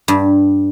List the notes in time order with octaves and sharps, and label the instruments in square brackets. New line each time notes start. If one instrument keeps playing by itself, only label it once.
[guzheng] G2